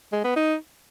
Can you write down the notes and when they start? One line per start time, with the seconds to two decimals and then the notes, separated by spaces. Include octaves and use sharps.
0.12 G#3
0.24 B3
0.36 D#4